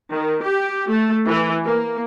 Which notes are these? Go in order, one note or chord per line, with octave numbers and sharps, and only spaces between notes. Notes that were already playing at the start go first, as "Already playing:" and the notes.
D#3
G4
A3
E3
A#3